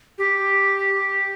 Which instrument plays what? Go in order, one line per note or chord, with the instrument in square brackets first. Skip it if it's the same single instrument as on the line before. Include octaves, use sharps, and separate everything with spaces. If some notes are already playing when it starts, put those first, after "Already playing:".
[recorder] G4